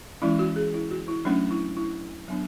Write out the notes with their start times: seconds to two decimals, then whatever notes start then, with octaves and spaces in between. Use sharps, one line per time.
0.22 E3 G#3 C#4 E4
0.39 F#4
0.56 G#4
0.74 E4
0.91 F#4
1.08 E4
1.25 F#3 A3 C#4 D4
1.51 E4
1.77 E4
2.28 F#3 B3 D4